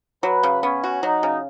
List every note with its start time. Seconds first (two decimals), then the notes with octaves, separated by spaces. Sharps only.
0.23 F#3 B4
0.43 C#3
0.63 B3 C#4
0.84 F#4
1.03 F#3 D#4
1.23 C#3